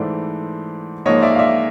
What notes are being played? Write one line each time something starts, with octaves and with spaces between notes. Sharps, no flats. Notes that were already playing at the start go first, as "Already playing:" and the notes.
Already playing: G#2 E3 A3 C5 D5
G#2 F3 A#3 C#5 D#5
D5 E5
F5
D5 E5